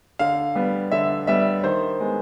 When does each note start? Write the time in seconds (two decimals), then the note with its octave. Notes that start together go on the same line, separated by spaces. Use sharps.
0.19 D3 F5
0.55 G3 B3
0.92 D3 E5
1.27 G3 B3 E5
1.64 D#3 C5
2.00 G#3 B3